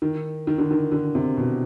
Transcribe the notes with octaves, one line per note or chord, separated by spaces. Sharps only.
D#3
D#3
D3
D#3
D3
C3
B2